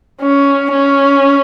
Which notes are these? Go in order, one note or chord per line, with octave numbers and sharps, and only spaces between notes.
C#4
C#4